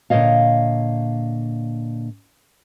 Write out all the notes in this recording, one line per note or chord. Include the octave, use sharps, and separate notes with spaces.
A#2 D3 C#5 D#5 F5